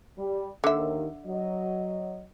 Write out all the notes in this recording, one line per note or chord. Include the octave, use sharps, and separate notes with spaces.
G3
D#2 D3 D#3 E5
F#3 D#5